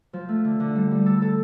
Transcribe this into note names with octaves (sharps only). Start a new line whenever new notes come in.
F3
A3
D3
D3
G3
G3
A4
A4